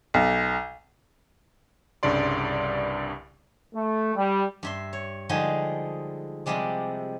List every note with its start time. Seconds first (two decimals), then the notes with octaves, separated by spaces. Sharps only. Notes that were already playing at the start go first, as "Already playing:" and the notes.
0.14 B1
2.03 C2 G2 C#3 D5 C6
3.75 A3
4.16 G3
4.63 G2 E5 C6
4.93 C#5
5.29 D3 F3 G3 G#3 D#4 G#4
6.46 C3 F3 G3 G#3 D5